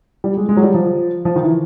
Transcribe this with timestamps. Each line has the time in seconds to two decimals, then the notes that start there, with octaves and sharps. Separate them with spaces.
0.24 G3
0.37 G#3
0.49 G#3
0.57 F#3
0.63 G3
0.74 F3
1.25 F3
1.36 D#3
1.43 E3